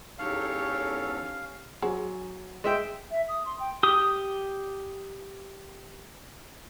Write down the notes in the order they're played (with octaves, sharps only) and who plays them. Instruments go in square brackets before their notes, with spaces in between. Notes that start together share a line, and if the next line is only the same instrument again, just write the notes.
[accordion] E2 G#2 A4 [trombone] C#4 [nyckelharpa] G4 C#5 [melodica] F5
[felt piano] F#3 [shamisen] F#4 G#4 C5
[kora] G#3 E5 G5
[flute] E5
D#6
C6
G5
[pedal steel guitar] G4 D#6